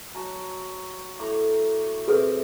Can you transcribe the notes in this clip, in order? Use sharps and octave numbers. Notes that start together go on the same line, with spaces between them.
F#3 A5
A2 A#5 D6
C3 G#4 A4 B4